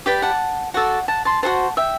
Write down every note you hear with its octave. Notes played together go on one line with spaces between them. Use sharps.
G4 B4 D5 G5 B5
F#5 A5
F#4 A4 D5 F#5
F#5 A5
A5 C6
F#4 A4 C5 F#5 A5
E5 G5